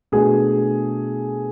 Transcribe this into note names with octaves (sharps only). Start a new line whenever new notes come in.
B2 A3 D4 G#4